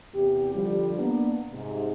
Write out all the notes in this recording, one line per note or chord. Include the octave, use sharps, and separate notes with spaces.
E2 C3 G4
D3 F3 G3
A#3 B3 D4
G#2 C3